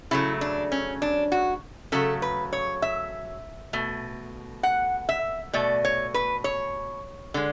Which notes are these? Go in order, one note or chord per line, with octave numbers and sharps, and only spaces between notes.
C#3 F#3 A3 E4
D4
C#4
D4
F#4
C#3 F#3 A3 A4
B4
C#5
E5
B2 A3
F#5
E5
B2 A3 D5
C#5
B4
C#5
D3 G#3